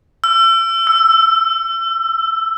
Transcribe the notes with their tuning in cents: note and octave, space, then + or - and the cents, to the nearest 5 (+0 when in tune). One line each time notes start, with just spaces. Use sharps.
E6 +35
E6 +5